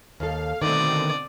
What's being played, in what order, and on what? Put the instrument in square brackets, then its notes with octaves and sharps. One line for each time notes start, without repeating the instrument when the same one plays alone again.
[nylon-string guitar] D#2 A4 [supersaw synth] F5
[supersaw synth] B2 D3 C4 [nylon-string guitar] D#3 A3 [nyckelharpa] D5 D#6